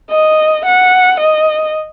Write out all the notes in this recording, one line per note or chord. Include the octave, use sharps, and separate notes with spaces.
D#5
F#5
D#5